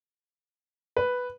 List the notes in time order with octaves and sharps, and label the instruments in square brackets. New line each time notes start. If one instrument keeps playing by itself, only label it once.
[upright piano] B4